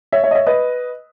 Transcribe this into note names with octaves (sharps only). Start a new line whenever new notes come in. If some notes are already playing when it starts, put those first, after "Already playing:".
C#5 E5
C#5 E5
D#5
C#5 E5
B4 D#5